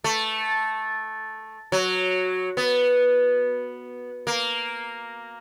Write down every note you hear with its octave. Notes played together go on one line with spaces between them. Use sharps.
A3
F#3
B3
A#3